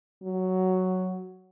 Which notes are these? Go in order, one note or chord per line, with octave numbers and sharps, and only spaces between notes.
F#3